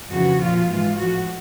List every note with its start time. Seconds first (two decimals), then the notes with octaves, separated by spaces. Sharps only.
0.11 F2 C#3 E3 F#4
0.40 A#2 F3 F4
0.68 G#2 E3 F4
0.97 A2 F3 F#4